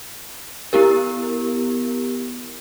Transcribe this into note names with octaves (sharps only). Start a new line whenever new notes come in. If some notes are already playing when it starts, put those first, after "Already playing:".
B3 E4 G4 A#4